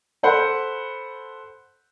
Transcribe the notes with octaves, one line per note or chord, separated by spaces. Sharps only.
A4 C5 F#5 B5